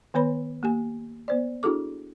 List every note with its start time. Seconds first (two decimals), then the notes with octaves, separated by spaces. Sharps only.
0.14 D#3 B3 B4 C#5 B5
0.63 A#3 G4 G#5
1.28 B3 C5 D5
1.63 D4 E4 F#4 G#4 A4 D6